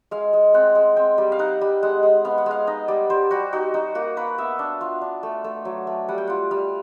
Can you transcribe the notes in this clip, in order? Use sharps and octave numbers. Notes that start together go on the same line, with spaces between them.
G#3 F5
G#3
C4 F#5
G#3
C4 G5
G3
F5
D#4 F#5
G3
G#3 F#5
G#3
B3 F5
F#5
G#3 F5
D#4 D#5
G3 D5
G3 C5
G3 F#4
D#4 F#4
D#4 F#4
A#3 F#4
A#3 B4
B3 E5
D4
F4 F5
D4
A3
A3
F#3
A3
G3 F#5
G5
F4 F#5
G3 F5